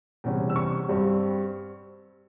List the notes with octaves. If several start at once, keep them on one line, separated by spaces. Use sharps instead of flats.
E2 C3 G3 C#4
E6
C#6
G2 G3 C4